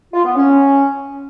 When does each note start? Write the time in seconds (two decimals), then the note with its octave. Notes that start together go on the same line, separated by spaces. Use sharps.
0.14 F4
0.25 B3
0.35 C#4